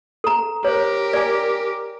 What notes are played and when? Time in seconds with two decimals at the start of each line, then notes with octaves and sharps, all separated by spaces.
0.24 A4 A#5
0.65 G4 A#4 C5 C#5
1.13 D5 G#5